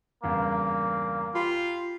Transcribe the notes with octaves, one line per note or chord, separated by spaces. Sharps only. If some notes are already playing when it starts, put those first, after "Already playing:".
E2 G2 C#3 A#3
F4 G4 B5 C6